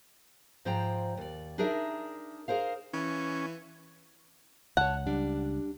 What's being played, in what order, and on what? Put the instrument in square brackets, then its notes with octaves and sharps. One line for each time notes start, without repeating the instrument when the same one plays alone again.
[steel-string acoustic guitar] G#2 F3 C5 D5 G5 A#5
D#2 D5
D4 D#4 G#4 A#4 D5 E5
G#4 A#4 C5 F5
[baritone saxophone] E3 [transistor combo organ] C#4
[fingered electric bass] C#2 [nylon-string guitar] C#5 A5 [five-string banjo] F#5
[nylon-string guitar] G3 D4